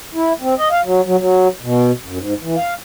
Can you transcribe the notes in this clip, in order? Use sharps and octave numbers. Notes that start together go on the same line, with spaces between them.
E4
C4
D#5
F5
F#3
F#3
F#3
B2
F#2
G#2
E3
F5